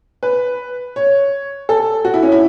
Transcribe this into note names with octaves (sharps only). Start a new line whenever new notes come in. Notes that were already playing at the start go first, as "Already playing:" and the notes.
B4
C#5
A4
F#4
E4
C#4
E4